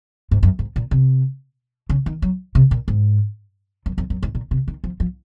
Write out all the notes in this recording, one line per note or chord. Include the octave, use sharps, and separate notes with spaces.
G#2
F#2
G#2
A#2
C3
C#3
D#3
F#3
C3
A#2
G#2
F#2
F2
F#2
G#2
A#2
C3
D#3
F3
F3